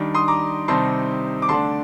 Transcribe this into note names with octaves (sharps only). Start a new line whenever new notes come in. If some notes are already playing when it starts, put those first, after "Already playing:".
Already playing: D#3 G3 D4
C6 D#6
A#5 D6
C3 D#3 G3 C4 D#4 A5 C6
D6
D3 A3 D4 A5 C6